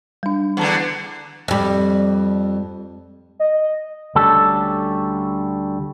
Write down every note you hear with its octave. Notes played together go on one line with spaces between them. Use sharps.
G3 D4
E2 D3 F#5 A5
F2 G3
D#5
D2 D3 G3 C#4 A4